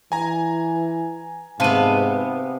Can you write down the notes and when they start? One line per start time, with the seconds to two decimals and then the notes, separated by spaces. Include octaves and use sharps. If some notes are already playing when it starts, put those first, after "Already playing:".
0.12 E3 G#5 A#5
1.60 G#2 C3 B3 F5 A5 D#7